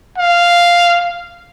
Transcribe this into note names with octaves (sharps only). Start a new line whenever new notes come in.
F5